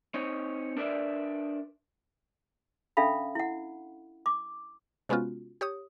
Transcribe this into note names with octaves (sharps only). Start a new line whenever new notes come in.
C4 D#4 C5 C#5
D4 A#4 B4 D5 E5
C#4 D4 A4 E5 F5 B5
E4 F#5
D6
C3 G#3 B3 C#4 F4 F#4
G4 C#5 D#6